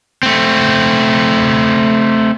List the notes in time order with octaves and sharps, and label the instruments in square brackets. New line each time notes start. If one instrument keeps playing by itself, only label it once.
[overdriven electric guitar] A3 C4